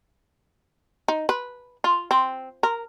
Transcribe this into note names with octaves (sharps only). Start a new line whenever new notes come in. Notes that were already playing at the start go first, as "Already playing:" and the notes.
D#4
B4
F4
C4
A#4